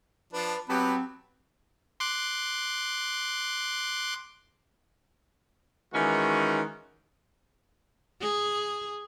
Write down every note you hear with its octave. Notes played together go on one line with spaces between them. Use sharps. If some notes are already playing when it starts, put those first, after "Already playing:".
F3 D4 B4
F#3 B3 C4 G4 B4 A5 B5
C6 D6 F#6
D#3 E3 G#3 C#4 D#4 F#4
G#4